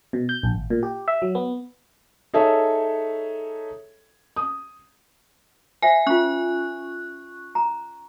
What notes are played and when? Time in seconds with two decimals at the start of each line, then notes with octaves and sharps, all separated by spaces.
0.13 B2
0.29 G6
0.43 A#1
0.55 G#1
0.70 A#2
0.83 G4
1.08 E5
1.22 F#3
1.35 B3
2.34 D#4 G#4 A4 C#5 E5
4.36 D#6
5.82 C5 E5 F#5 G#5
6.07 C#4 F4 C#6 F#6
7.55 A#5